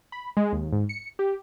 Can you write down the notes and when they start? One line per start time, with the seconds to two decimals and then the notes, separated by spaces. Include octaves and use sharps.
0.12 B5
0.37 G#3
0.52 D#2
0.72 G#2
0.89 C#7
1.19 G4